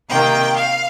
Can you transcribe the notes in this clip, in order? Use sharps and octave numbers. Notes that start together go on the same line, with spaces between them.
C3 D#3 A#3 G5
F5